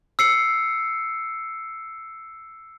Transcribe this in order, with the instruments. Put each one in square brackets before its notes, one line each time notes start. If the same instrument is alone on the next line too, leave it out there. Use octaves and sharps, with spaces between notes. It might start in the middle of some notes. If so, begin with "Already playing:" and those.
[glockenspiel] E6 C7 C#7